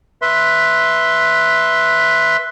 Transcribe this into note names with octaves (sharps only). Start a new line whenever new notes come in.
B4 E5 C6